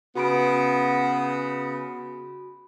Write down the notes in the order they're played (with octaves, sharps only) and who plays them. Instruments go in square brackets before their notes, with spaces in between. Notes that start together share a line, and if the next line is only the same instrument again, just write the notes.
[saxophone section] C#3 B3 [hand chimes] F#4 B5 D7